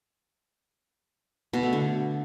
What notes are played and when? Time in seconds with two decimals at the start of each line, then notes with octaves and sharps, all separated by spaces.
1.53 B2
1.63 A3
1.73 D3